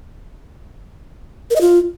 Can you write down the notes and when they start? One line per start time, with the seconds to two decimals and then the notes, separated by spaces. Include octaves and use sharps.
1.50 A#4
1.56 D#5
1.61 F4